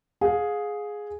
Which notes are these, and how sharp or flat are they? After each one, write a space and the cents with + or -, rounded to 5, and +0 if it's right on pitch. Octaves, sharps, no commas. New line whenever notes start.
G#4 +5 F5 +30